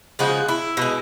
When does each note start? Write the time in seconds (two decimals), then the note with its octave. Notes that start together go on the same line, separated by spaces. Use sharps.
0.19 C#3 F3 G#3 F#4
0.48 E4
0.77 B2 G#3